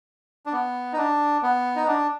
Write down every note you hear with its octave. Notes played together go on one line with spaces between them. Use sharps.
D4
B3
D#4
D4
B3
D#4
D4